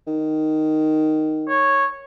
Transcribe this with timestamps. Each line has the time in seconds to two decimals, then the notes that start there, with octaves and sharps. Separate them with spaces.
0.07 D#3
1.49 C#5